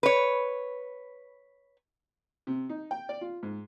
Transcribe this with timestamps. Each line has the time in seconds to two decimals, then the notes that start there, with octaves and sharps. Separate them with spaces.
0.03 B4 C#5
2.47 C3
2.69 D#4
2.91 G5
3.09 D5
3.21 F4
3.43 G#2